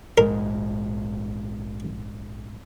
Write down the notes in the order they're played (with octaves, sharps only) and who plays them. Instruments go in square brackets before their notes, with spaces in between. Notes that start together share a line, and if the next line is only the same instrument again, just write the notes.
[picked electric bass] A#1 G#2 G#3 [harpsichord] A#4